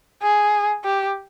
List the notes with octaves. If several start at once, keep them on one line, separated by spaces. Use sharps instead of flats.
G#4
G4